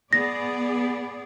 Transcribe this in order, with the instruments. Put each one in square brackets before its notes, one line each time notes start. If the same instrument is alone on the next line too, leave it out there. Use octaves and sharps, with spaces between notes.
[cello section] B3 G#4 D5 [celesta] A#6